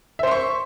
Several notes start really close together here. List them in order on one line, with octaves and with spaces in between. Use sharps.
E5 C5 C6 C#6